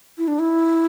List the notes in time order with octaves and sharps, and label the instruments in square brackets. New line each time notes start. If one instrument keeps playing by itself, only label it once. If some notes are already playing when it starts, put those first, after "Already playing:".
[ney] E4
D4
E4